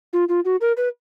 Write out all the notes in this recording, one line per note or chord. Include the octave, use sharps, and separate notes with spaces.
F4
F4
F#4
A#4
B4